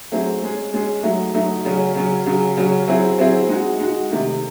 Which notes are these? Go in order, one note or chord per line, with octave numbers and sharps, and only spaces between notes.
F#3 A3 C4 D#4 G#4
G#3 C#4 G#4
G#3 C#4 G#4
F#3 A3 D#4
F#3 A3 D#4
C#3 F#3 C#4
C#3 F#3 C#4
C#3 F#3 C#4
C#3 F#3 C#4
F#3 C4 E4 G#4
F#3 C4 E4 G#4
G#3 D#4 F#4
G#3 D#4 F#4
C3 D#3 A3 D#4